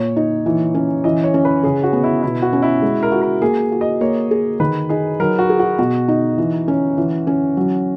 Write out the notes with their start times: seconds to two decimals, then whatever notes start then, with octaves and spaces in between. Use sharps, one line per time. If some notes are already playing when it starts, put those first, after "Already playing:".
Already playing: A#2 C#5
0.16 D#4
0.46 E3
0.74 C#4
1.04 E3 D#5
1.24 C#5
1.34 C#4
1.45 B4
1.63 C#3 G#4
1.83 F#4
1.93 B3
2.04 E4
2.23 B2 E4
2.42 F#4
2.53 C#4
2.62 E4
2.82 G#3
3.03 A#4
3.12 F#4
3.22 A#4
3.42 A#3 G#4
3.72 F#4
3.81 D#5
4.01 A#3 C#5
4.31 G#4
4.60 D#3 B4
4.89 D#4 G#4
5.20 F#3 A#4
5.39 F#4
5.50 G#4
5.59 F#4
5.78 B2 F#4
6.08 D#4
6.38 E3
6.68 C#4
6.98 E3
7.27 C#4
7.57 F#3